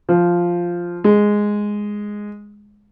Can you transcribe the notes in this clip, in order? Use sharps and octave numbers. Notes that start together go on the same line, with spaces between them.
F3
G#3